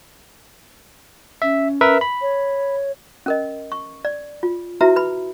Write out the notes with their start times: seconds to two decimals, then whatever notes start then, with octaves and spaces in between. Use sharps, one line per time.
1.42 C#4 E5
1.81 A#4 B4 E5
2.01 B5
2.21 C#5
3.26 C#4 A#4 D#5
3.72 C#6
4.05 D5
4.43 F4
4.81 E4 F#4 B4 E5 A#5
4.96 B4 B5